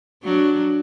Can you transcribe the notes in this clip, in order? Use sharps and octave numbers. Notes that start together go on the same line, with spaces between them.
F#3 D4